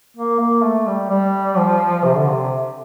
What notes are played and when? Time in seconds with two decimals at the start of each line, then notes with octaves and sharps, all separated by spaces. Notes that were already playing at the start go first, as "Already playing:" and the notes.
0.17 A#3
0.40 A#3
0.63 A3
0.87 G3
1.10 G3
1.57 F3
2.04 C3
2.16 D3
2.28 C3